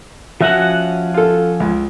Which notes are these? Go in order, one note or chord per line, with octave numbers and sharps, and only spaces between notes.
F3 C#4 F#4 E5 F#5
F4 A4
C#2